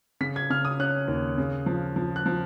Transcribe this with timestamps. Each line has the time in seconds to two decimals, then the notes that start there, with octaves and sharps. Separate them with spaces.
0.21 C#3 B6
0.36 G#6
0.50 C#3 F6
0.65 D#6
0.79 C#4 F#6
1.08 D#2
1.38 C#3
1.66 F3
1.96 F3
2.16 F#6
2.26 F3